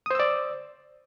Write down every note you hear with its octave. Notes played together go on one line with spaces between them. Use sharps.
C5 D5 D#6 E6